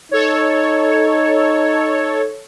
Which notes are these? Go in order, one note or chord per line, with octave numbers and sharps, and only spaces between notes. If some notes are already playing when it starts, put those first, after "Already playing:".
D#4 A4 C#5